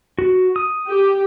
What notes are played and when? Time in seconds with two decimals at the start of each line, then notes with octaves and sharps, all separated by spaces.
0.19 F#4
0.56 D#6
0.88 G4